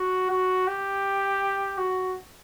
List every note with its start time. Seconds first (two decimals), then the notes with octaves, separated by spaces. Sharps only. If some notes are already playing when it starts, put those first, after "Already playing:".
Already playing: F#4
0.30 F#4
0.67 G4
1.78 F#4